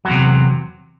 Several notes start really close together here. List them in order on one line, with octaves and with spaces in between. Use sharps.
F#3 E2 C3